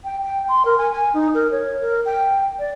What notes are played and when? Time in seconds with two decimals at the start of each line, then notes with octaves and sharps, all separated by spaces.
0.04 G5
0.23 G5
0.48 C6
0.65 A#4
0.78 G#5
0.92 G#5
1.14 D#4
1.34 A#4
1.51 C#5
1.81 A#4
2.06 G5
2.59 D5